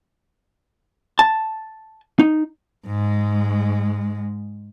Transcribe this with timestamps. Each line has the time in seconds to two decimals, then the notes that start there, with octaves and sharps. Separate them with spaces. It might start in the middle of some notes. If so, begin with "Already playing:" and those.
1.19 A5
2.19 D#4
2.87 G#2 G#3